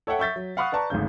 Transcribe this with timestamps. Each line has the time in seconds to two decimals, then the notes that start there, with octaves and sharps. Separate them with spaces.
0.07 A4 C#5 E5 F#5 G5
0.19 E5 C#6 G6 A6 B6
0.36 F#3
0.57 F5 F#5 B5 C#6 D#6 F#6
0.72 B4 D5 A5 A#5 C#6
0.90 G#1 D2 G#2 C#3 G6